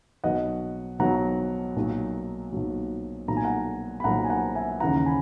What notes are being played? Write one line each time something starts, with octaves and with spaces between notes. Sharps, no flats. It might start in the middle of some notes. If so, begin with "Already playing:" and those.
B1 B2 F#3 D#5 F#5
B1 B2 F#3 F#5 A#5
B1 A#2 F#3
B1 A#2 F#3
B1 A#2 F#3 A#5
G#5
F#5 A#5
B5
B1 A#2 F#3 F#5 A#5
G#5
F#5 A#5
E5 G#5
D#2 C#3 E3 F#5 A#5
G#5 B5